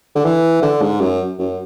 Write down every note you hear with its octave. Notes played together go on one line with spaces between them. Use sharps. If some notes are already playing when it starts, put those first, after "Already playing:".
D3
E3
D3
G#2
F#2
F#2